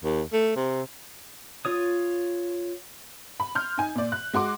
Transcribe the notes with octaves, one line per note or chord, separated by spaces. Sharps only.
D#2
A3
C3
F4 C#5 D#6
B5
C6 F6 G6
D#4 G#5
A#2 D5
F#6
G#3 F#4 C6 D6